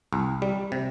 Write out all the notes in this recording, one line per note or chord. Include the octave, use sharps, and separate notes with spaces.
C2
G3
C3